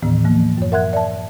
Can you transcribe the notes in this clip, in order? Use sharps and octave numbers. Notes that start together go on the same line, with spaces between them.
D#2 A2 D#3 E3 B3
E3 F3 A#3
F#2 C#5
A#4 E5 F#5 C6 F#6 G#6
D5 E5 A5